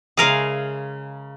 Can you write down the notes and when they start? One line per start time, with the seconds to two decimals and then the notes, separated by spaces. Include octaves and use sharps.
0.17 C#3 G#3 G#4 A#4 E5 F5